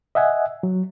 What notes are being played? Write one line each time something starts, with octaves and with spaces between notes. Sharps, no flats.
D#5 E5 F#5 G#5
F#3